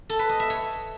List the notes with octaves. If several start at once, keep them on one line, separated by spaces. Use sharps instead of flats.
A4
B4
D#5
E5
C#5